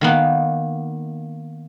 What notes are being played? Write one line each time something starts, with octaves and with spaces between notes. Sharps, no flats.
D#3 A#3 B3